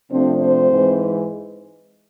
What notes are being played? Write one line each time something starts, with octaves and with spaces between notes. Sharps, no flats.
C3 F3 A3 C4 D4 C5
C4 C5
G#2 E3 G#3